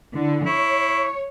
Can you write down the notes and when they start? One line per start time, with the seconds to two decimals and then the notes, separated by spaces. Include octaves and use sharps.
0.14 D3 E4
0.46 E4 C#5 C#6